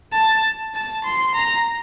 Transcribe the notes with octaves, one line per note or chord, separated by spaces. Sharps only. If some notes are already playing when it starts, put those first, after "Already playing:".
A5
A5
C6
A#5